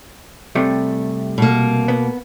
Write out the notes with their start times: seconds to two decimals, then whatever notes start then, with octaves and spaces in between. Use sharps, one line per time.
0.55 C3 G3 A3
1.38 B2 A#3
1.88 B3